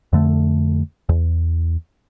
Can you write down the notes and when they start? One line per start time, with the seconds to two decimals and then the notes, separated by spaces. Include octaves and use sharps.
0.13 F2 D3 A3
1.09 E2